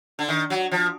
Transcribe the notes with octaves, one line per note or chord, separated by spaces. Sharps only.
D3
D#3
F#3
F3